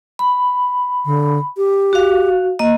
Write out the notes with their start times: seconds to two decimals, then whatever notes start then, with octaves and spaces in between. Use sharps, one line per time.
0.19 B5
1.05 D3
1.57 G4
1.93 F#4 F5
2.59 A#3 D#5